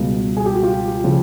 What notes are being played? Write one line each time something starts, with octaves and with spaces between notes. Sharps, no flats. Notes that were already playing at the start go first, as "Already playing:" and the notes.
Already playing: C#2 B2 G3
G#4
G4
F#4
F4 G4
C#3 F3